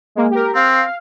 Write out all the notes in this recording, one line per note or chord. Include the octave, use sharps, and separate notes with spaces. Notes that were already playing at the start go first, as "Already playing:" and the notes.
G#3 A#3
G4 A#4
C4 F5